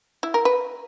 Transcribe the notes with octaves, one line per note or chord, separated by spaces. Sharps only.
E4
A#4
B4